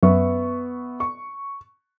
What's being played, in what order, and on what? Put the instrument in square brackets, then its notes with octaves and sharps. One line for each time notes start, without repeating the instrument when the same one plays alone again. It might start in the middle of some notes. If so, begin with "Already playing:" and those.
[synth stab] F#2 [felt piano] B3 E5 C#6
[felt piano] C#6